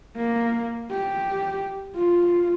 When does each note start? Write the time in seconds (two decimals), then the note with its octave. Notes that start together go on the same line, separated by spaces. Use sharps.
0.16 A#3
0.91 G4
1.96 F4